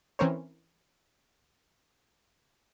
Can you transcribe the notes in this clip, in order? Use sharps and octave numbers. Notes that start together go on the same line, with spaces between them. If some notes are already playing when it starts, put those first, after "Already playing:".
E3 C4 C#4 A#4 C5 C#5